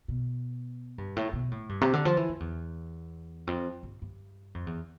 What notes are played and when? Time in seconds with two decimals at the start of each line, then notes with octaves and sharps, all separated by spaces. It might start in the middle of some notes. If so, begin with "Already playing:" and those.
0.08 B2
0.98 G2
1.16 A2
1.33 B2
1.51 A2
1.69 G2
1.81 C3
1.93 D3
2.05 F3
2.17 E3
2.29 F2
2.40 E2
3.47 F2
3.83 G2
4.02 G2
4.55 F2
4.67 E2